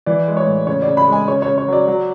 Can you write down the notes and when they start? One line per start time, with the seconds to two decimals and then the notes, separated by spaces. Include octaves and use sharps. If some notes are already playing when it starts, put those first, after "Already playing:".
0.06 E3 D5
0.27 G#3
0.37 C#5
0.47 A2
0.67 C#3 C#5
0.82 D5
0.88 C#3
0.97 B5
1.08 G#3 G#5
1.27 C#3 C#5
1.42 C#3 C#5
1.58 C#5
1.68 F#3 D5
1.87 F#3